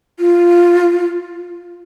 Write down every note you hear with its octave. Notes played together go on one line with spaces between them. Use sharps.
F4